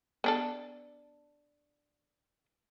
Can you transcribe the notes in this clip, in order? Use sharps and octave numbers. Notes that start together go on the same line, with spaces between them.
B3 D4 A4